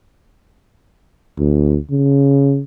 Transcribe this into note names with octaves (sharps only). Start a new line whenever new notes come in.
D2
C#3